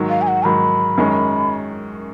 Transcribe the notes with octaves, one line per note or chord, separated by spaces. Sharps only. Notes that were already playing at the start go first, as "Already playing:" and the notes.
Already playing: G#2 D#3 F#3
F5
G#5
F#5
G#2 D#3 F#3 B5
F#2 D#3 G#3 C#4